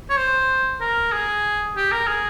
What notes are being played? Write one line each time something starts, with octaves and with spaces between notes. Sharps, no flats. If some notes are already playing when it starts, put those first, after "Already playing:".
C#5
C5
A#4
G#4
G4
A#4
G#4